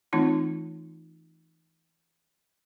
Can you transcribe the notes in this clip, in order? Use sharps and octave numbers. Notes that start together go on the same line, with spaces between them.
E3 A3 C4 D#4 F4